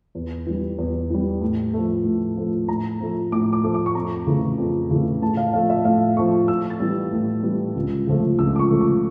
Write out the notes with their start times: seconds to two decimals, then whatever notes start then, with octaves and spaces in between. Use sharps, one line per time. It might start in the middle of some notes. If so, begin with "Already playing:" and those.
0.15 E2
0.46 E3 G3
0.78 E2
1.10 E3 G3
1.42 A2
1.73 F3 A3
2.05 A2
2.37 F3 A3
2.68 A2 A#5
3.00 F3 A3
3.32 A2 D6
3.53 D6
3.64 F3 A3
3.74 D6
3.86 C#6
3.95 F2 A#5
4.27 C#3 E3 A3
4.58 F2
4.91 C#3 E3 A3
5.22 A2 A5
5.37 F5
5.54 F3 A3 F5
5.70 E5
5.85 A2 F5
6.17 F3 A3 C#6
6.48 A2 E6
6.70 A6
6.80 E3 G3
7.12 A2
7.43 E3 G3
7.76 C#2
8.07 C#3 F3 A3
8.39 C#2 E6
8.56 D6
8.59 C#6
8.71 C#3 F3 A3
8.81 C#6